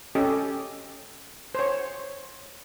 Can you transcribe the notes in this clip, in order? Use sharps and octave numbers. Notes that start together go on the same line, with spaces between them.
C#4 G4 A4 D#5
C5 C#5